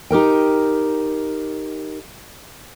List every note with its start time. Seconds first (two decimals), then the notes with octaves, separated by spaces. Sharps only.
0.11 D#4 G4 A#4 G5